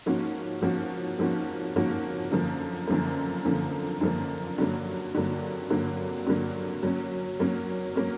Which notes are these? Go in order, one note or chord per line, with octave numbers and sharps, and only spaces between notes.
G#2 F3 A#3 C#4 F#4
G#2 F3 A#3 C#4 F#4
G#2 F3 A#3 C#4 F#4
G#2 F3 A#3 C#4 F#4
F#2 D3 F3 A#3
F#2 D3 F3 A#3
F#2 D3 F3 A#3
F#2 D3 F3 A#3
G2 D3 F#3 A#3
G2 D3 F#3 A#3
G2 D3 F#3 A#3
G2 D3 F#3 A#3
F#3 A#3 C#4
F#3 A#3 C#4
F#3 A#3 C#4